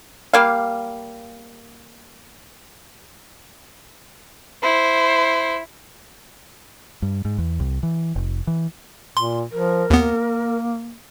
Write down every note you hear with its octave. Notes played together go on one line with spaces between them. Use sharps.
G3 A#3 F5
E4 C5
G2
G#2
E2
C2
E3
F1
E3
A#2 C6
F3 A#4
D#2 A#3 B3